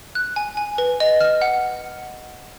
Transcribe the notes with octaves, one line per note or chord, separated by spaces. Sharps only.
F#6
G#5
G#5
B4
D#5
F6
F#5